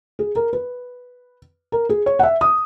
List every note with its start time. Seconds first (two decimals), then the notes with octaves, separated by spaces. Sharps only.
0.19 G#4
0.36 A#4
0.53 B4
1.72 A#4
1.89 G#4
2.06 C#5
2.19 F#5
2.23 E5
2.41 D#6